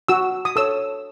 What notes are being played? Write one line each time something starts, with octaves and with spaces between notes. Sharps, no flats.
F#4 E6
D#6
A4 C#5 E6